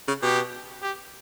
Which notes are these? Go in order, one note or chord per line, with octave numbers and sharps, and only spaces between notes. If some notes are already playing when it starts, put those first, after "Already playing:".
C#3
B2 G4
G4